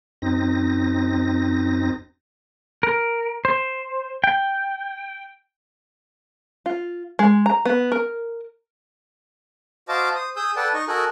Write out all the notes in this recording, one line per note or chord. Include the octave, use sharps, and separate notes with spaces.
F#2 C4 D#4 A#6
A#4
C5
G5
F4
G#3
A#5
B3
A#4
F#4 C5 D#5 F5 A5 D6
C5 D#6
G#4 D#6 E6 G6
A4 B4 D5 F#5 G5 A5
D#4 D#5 C#6
F#4 A4 A#4 D#5 G#5 F#6